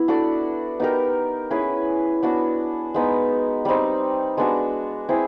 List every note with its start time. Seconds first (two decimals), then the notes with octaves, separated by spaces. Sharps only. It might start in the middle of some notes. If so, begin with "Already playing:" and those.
Already playing: B3 E4
0.08 D4 F#4 A4 D5
0.80 B3 D#4 G4 A#4
1.51 C#4 E4 G#4 B4
2.23 B3 D4 F#4
2.94 G#3 B3 D#4
3.65 G3 C4 D#4
4.37 G#3 B3 D4 F#4
5.09 C4 E4 G#4